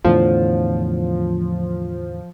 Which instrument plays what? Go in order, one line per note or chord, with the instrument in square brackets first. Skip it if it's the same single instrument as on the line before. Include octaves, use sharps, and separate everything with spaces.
[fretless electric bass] E2 A2 D3 [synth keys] F3